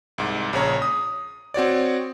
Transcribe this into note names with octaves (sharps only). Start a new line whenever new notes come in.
C2 G#2
A#1 C#3 C#5 A#5
D#6
C4 F#4 C#5 D5